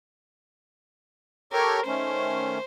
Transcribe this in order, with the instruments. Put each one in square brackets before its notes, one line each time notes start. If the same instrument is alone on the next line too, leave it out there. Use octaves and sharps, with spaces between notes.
[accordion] G4 A4 C#5 [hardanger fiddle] A#4
[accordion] D#3 A3 C#4 [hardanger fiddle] C5